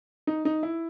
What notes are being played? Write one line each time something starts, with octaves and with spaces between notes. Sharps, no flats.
D#4
D#4
E4